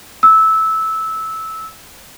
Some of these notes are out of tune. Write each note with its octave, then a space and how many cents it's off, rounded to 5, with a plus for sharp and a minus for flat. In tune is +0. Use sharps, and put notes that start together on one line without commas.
E6 -15